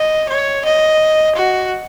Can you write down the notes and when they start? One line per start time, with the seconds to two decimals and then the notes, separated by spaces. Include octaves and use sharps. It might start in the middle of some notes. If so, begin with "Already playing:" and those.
Already playing: D#5
0.29 C#5
0.65 D#5
1.36 F#4